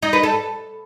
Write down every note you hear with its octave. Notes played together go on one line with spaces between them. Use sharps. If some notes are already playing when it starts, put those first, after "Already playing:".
D#4
B4
A4